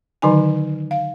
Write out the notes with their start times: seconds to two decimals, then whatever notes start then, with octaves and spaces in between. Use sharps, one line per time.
0.22 D3 D#3 F#3 D#4 G#5
0.91 F5